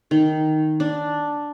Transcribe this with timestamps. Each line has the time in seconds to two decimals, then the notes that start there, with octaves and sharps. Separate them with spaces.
0.11 D#3
0.80 D4